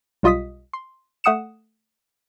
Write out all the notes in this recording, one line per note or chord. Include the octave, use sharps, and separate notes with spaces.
B1 G3 F4 D#5 D#6 B6
C6
A3 F#5 D#6 C#7 E7